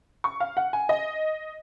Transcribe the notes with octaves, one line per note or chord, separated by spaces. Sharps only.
C#6
F5
F#5
G#5
D#5